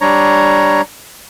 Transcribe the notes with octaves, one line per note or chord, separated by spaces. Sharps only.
G3 D4 C#5 A#5